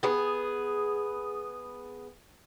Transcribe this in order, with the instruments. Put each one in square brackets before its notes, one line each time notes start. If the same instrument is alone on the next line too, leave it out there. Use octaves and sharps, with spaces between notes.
[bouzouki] B3 G#4